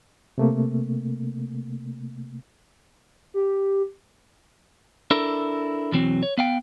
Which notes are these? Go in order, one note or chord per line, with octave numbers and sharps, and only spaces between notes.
C3 A3 A#3
G4
D4 E4 A4 A#4
B1 E2 E3 F#3 C4
C#5
B3 F5 G5